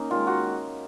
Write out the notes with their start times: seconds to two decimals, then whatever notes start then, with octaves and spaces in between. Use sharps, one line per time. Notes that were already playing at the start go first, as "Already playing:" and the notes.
Already playing: A#3 C#4 D#4
0.10 D#3 G#3 F4
0.27 F#4